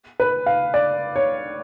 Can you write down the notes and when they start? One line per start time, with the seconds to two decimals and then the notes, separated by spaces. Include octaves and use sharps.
0.20 B4
0.46 F5
0.74 D5
1.16 C#5